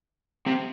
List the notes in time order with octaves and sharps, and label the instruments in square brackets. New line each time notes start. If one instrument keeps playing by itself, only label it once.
[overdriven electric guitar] C3